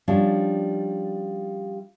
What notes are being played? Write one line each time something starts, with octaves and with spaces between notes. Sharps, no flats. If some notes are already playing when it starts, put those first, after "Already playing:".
F3 G3 C#4 D4 F4 C#5